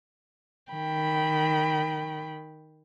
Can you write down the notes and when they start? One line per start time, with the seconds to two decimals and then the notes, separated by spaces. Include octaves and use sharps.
0.72 D#3 G5 B5